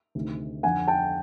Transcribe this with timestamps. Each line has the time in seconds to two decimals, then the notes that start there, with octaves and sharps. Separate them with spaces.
0.15 D2 C3 D#3
0.63 F2 D3 F#5 G#5
0.88 G5 A5